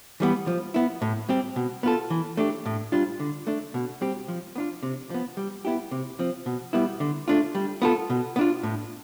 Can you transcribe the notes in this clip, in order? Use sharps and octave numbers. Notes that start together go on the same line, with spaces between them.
E3 G3 B3
F3
B3 E4
A2
G3 C4 G4
B2
B3 F4 A4
E3
A3 D4 G4
A2
G3 D4 F4
D3
A3 D4
B2
G3 C4 G4
F3
B3 D4 F4
C3
F3 B3
G3
B3 E4 G4
C3
F3 C4
B2
G3 B3 E4
D3
A3 D4 F4
G3
B3 F4 A4
B2
B3
D4 F4
A2